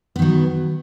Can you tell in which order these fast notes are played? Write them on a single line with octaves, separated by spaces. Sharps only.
B3 D#3 F#3